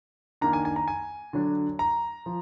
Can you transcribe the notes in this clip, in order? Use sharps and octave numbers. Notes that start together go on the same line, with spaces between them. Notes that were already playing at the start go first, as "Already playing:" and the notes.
D#3 A#3 D4 A#5
G#5
G#5
A#5
G#5
D3 F#3 D4
A#5
F3